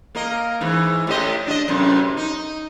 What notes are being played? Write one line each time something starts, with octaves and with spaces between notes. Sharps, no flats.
A#3 A#4 D#5
G#2 E3
A2 G4 D#5
D4 D#5
F#2 A2 C3
D#4